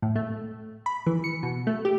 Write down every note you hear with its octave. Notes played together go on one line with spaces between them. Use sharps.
A2
A3
B5
E3
C#7
B2
A3
G4